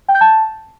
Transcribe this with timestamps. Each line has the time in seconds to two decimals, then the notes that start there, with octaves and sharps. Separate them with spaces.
0.08 G5
0.15 G6
0.21 A5